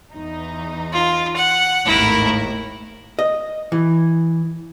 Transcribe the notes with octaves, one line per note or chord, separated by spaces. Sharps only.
E2 D#4
F4
F#5
G#1 D#2 A2 E4 A#4
D#5
E3